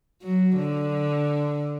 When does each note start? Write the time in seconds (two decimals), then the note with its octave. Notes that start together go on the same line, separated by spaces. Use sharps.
0.23 F#3
0.57 D3